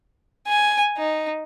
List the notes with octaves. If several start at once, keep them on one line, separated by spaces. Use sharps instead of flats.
G#5
D#4